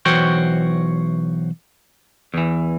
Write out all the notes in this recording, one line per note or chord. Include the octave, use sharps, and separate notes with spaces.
B1 E3 F#4 C5 C#5 G5
E2 E3